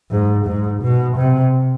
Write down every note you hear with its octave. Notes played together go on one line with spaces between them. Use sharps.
G#2
G#2
B2
C3